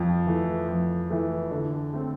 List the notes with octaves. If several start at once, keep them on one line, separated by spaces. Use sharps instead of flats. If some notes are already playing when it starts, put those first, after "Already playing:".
Already playing: F2
E3 A3
F2
E3 A3
D3
A3 C4